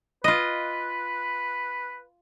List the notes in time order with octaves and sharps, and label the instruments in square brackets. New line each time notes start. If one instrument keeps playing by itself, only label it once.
[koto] F4 D#5 [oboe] B4